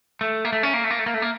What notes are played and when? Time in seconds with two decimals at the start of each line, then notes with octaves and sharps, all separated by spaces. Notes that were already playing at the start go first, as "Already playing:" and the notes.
0.21 A3
0.45 A#3
0.53 A3
0.63 C#4
0.74 A#3
0.84 A3
0.91 A#3
0.99 A3
1.06 A#3
1.14 A3
1.22 A#3